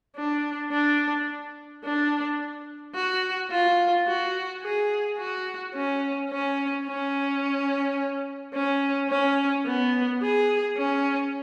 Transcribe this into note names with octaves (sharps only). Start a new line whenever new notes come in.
D4
D4
D4
F#4
F4
F#4
G#4
F#4
C#4
C#4
C#4
C#4
C#4
B3
G#4
C#4